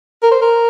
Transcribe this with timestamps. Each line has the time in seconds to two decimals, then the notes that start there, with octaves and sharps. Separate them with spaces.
0.23 A#4
0.32 C5
0.42 A#4